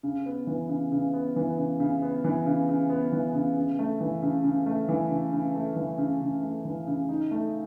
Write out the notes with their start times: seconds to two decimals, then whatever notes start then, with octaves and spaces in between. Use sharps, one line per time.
0.03 C#3
0.26 B3
0.47 E3
0.69 C#3
0.92 C#3
1.13 B3
1.36 E3
1.58 C#3
1.80 C#3
2.02 B3
2.24 E3
2.46 C#3
2.69 C#3
2.90 B3
3.13 E3
3.35 C#3
3.56 C#3
3.79 A3
4.00 E3
4.23 C#3
4.44 C#3
4.66 A3
4.89 E3
5.11 C#3
5.33 C#3
5.55 A3
5.76 E3
5.98 C#3
6.21 C#3
6.43 A3
6.65 E3
6.87 C#3
7.09 D#4
7.31 A3